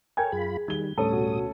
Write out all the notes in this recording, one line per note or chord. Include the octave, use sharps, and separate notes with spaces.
A4 A#4 C#5 G5 G#5 G#6
F#2 F4 G#4 B5
D#3 G3 G#6 G7
D2 A2 G3 C#4 A4 D#6
B2 F#4